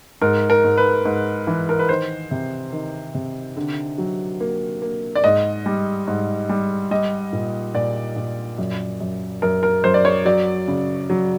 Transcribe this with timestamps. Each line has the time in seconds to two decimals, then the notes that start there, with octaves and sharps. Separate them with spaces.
0.22 G#2 A#4
0.50 A#4
0.64 G#2
0.77 B4
1.05 G#2
1.47 E3
1.69 A#4
1.79 B4
1.89 D#3 C5
2.31 C3
2.72 D#3
3.14 C3
3.57 D3
3.98 F#3
4.40 A#3
4.82 A#3
5.15 D5
5.24 G#2 D#5
5.66 G3
6.07 G#2
6.49 G3
6.91 G3 D#5
7.33 A#2
7.75 A#2 D5
8.16 A#2
8.58 F#2
9.00 F#2
9.42 F#2 A#4
9.63 A#4
9.84 F#2 C5
9.94 D5
10.05 C#5
10.25 F#3 D5
10.68 C#3
11.10 F#3